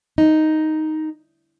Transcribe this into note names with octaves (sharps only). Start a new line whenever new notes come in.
D#4